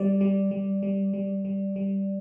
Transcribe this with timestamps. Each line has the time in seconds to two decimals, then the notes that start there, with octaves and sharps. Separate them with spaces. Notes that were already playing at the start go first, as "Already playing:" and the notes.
Already playing: G3 D5
0.21 G3
0.51 G3
0.83 G3
1.13 G3
1.45 G3
1.76 G3